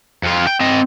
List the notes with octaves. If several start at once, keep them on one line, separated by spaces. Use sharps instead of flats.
F2 F4
G5
C4 D#5